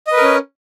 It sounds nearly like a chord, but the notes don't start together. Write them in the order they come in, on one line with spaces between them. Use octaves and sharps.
D#5 B4 A#4 C#4